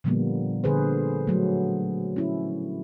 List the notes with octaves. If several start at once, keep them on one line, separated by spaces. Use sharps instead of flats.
A#2 D3 F3 G3 A#3 B3
D3 G#4 B4 C5
F#3 A3
C#4 E4